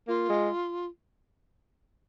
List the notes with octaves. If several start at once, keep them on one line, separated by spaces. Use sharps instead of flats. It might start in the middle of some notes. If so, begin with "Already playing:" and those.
A#3 F4
G#3